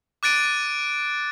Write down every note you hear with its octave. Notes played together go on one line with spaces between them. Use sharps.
D6 F#6 A6 D7 D#7